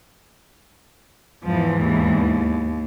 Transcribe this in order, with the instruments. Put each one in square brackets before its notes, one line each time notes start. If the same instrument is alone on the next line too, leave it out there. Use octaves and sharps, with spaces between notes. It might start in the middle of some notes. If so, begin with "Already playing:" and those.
[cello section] E2 G#2 E3 [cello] F3
[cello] D#2